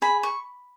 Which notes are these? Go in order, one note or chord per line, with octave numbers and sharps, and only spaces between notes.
G#4 B5
C#6